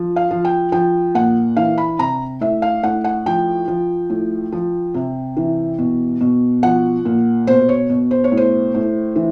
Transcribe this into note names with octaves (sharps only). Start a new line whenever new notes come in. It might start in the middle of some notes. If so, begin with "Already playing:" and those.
Already playing: F3
F5
F3
G5
F3 G5
A#2 F#5
E3 F5
B5
C3 A#5
A2 E5
F5
A2 F#5
F#5
F3 G5
F3
A2
F3
C3
E3
B2
B2
F3 F#5
A#2
B2 C5
C#5
B2
C5
C#5
A2
C5
A2
E3